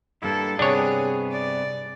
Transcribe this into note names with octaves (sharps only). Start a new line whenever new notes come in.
G2 A#3 E4 A4
G2 C3 B3 D4 G#4 C#5
D5